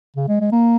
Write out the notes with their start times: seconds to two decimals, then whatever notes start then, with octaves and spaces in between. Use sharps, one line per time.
0.16 C#3
0.28 G#3
0.41 G#3
0.52 A#3